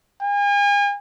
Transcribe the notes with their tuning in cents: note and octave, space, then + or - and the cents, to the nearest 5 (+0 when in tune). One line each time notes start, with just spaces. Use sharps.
G#5 -40